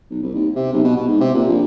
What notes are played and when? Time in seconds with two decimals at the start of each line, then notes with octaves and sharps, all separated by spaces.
0.10 B1
0.22 C2
0.35 D#2
0.55 C3
0.73 B1
0.84 B2
0.96 B2
1.08 G#2
1.21 C3
1.34 A#2
1.48 A#1